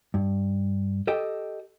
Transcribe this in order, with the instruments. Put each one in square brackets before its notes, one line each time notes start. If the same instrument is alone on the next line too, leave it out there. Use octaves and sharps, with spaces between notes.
[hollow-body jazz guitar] G2
G4 A4 D#5 G5